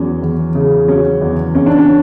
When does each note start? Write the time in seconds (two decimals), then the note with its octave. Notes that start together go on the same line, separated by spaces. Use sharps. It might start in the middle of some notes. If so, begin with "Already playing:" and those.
Already playing: E2 F#3 C#4
0.22 E2
0.55 C#3
0.88 F#3 C#4
1.21 E2
1.55 E2 C#4
1.66 D4
1.77 C#4